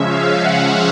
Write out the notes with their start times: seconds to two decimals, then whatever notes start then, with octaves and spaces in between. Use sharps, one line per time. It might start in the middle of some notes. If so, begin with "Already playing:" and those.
Already playing: C#3 F3 G#3 C#4 E5
0.10 F5
0.45 F#5